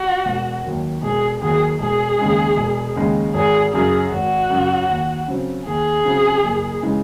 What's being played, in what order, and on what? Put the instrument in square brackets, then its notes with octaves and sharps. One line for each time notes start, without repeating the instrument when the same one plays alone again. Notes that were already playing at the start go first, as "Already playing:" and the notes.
Already playing: [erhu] F#4
[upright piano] E1
D#2 D#3 F#3
[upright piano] E1 [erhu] G#4
[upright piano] D#2 D#3 F#3 [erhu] G#4
[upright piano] E1 [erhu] G#4
[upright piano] D#2 C#3 G#3
E1
D#2 C#3 G#3
[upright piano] G#1 [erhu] G#4
[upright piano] F#2 C#3 [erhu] G#4
[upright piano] G#1 [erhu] F#4
[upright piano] F#2 C#3
D#2
C#3 F#3 C4
[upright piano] D#2 [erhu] G#4
[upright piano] C#3 F#3 C4
F#1
C#3 E3 G#3